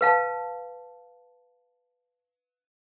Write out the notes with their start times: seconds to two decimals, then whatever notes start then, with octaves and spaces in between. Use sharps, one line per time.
0.01 B4 F5 A5